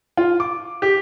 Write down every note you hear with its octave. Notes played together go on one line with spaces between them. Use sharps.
F4
D6
G4